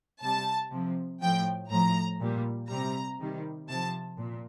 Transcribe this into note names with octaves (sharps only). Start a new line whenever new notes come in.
C3 G3 A5
C3 F3
A2 F3 G5
A2 F3 A#5
A#2 G3
C3 G3 A#5
C3 D#3 G3
C3 F3 A5
A#2